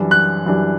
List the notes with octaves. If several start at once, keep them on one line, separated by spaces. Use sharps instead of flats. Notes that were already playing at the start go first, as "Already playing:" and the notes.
Already playing: F#2 E3 G3 D4
F#6
F#2 E3 G3 D4